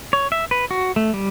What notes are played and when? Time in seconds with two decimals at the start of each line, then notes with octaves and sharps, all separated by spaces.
0.13 C#5
0.32 E5
0.51 B4
0.71 F#4
0.96 A3
1.14 G3